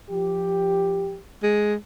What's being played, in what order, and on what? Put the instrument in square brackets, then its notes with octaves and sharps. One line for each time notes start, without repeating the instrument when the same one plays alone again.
[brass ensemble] F3 G4
[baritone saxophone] G#3